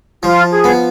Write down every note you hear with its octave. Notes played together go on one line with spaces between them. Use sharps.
F3 F4
G#4
B3